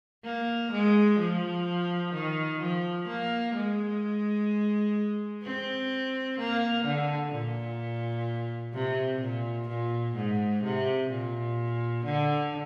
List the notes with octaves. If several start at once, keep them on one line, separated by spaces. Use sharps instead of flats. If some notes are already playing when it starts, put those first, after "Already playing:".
A#3
G#3
F3
D#3
F3
A#3
G#3
C4
A#3
D3
A#2
C3
A#2
A#2
G#2
C3
A#2
D3